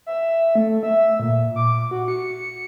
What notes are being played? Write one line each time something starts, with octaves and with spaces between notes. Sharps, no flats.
E5
A3
E5
A#2
D6
F#4
C#7